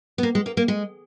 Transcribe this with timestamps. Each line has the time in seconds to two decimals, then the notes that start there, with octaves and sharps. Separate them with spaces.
0.18 B3
0.23 A#3
0.35 G#3
0.46 A#3
0.57 A#3
0.68 G#3